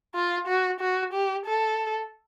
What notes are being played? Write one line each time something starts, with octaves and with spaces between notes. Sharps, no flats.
F4
F#4
F#4
G4
A4